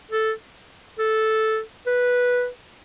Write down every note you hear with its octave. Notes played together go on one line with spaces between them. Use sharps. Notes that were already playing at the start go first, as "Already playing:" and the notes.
A4
A4
B4